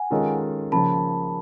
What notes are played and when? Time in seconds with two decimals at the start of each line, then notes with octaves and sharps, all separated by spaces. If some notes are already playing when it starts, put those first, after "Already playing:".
Already playing: F#5 G#5
0.10 D#3 G#3 C#4 F4 A4
0.72 C#3 F3 A#3 A5 B5